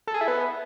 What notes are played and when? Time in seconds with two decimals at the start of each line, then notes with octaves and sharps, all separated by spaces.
0.08 A4
0.14 G#4
0.21 E4
0.28 B3